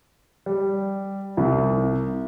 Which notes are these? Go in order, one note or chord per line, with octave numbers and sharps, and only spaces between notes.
G3
C2